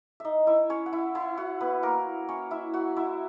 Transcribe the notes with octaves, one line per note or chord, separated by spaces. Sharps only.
D#4 D#5 E5
E4 E5
C#4 C#5
F#5
E4 E5
E4 E5
F#4 F#5
B3 B4
A#3 A#4
C#4 C#5
E4 E5
F#4 F#5
E4 E5